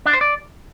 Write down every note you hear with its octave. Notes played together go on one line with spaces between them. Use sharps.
D4
C5
D5